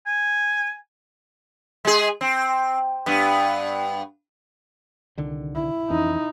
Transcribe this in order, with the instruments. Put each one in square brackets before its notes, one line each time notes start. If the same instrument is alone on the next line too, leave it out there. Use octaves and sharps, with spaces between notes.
[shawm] G#5
[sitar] G#3 G#4
C4
G2 B3
[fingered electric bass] C2 D3 D#3
[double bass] E4
[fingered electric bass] F2 E3 C#4 [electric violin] D#4